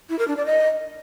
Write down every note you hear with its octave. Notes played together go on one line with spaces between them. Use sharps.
E4
A#4
D4
D5
D#5